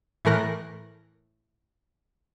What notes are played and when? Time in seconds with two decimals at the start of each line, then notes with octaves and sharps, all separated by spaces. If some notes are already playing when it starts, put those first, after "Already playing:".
0.25 A2 E3 A3 A#4 F#6 A#6